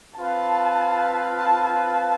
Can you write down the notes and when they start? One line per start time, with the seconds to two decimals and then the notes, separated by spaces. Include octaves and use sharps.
0.16 C4 F4 B4 F5 A5
1.36 A5
1.65 A5